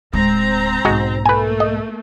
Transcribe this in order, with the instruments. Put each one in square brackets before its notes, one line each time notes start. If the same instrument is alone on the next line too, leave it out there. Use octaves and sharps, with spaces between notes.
[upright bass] D1 G#3 [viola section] C4 A#5
[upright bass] B1 G#2 [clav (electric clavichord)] G#3 F#4
[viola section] A3 A#3 [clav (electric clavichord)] B4 G#5
[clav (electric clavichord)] D#5